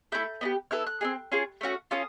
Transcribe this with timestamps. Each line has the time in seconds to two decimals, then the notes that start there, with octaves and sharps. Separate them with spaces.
0.12 A3 C4 E4 A4 G6
0.41 B3 D#4 G4
0.71 B3 E4 A4 F6
0.87 F#6
1.01 C4 D#4 G#4
1.32 C#4 F4 G#4
1.61 A3 C#4 F#4
1.91 C#4 F4 A4 D#6